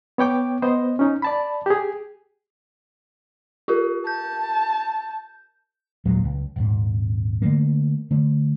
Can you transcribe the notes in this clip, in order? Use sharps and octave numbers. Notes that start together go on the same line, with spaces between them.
B3 C#5 G5 D6
B3 C5 D#5
C#4 D#4
D5 A5 B5
G4 G#4
F4 G4 A#4
A5 G6
D#2 A#2 F#3 G#3
C#2
D#1 G#1 G#2
D3 D#3 A3 A#3
D3 A3